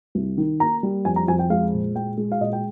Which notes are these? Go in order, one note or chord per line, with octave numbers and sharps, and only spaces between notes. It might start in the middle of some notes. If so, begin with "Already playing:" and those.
C2
D#3
A#3 A#5
G3
F2 G#5
A#5
F2 G#5
G5
G#3 F5
A#2
G#3 G5
G#3
F5
A#2 D#5
G5